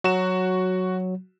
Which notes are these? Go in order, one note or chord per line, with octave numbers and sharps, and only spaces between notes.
F#3 F#4 E7